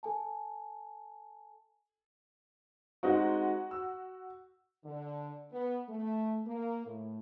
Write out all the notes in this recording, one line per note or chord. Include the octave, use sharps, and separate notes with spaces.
A4 G#5 A5
G#3 C4 D#4 F#4
E6
D3
B3
A3
A#3
A2